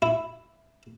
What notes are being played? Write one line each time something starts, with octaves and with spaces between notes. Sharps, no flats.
E4